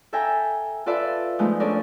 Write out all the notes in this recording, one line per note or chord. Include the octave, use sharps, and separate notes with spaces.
A4 E5 G5 G#5 A#5
F4 A4 B4 D5 E5 F5
F3 G#3 A3 B3 D#4
C#4 D4 A4 A#4 D5